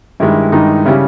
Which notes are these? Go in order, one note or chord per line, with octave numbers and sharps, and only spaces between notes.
G2 D#3 G#3 E4
G2 D#3 G#3 D#4
C#3 G3 C#4 E4